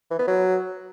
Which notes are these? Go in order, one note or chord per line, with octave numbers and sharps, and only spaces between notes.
E3
B3
F#3